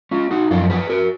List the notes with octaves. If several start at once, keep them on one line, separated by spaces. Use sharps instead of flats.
C#4 F4
D#4 F#4
F#2 F3 C#4 F4
G#4 B4
F#4 A#4